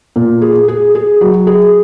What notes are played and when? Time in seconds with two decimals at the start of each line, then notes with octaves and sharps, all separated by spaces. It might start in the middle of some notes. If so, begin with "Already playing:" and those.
0.16 A#2
0.42 G#4
0.68 G#4
0.95 G#4
1.21 F#3
1.47 G#4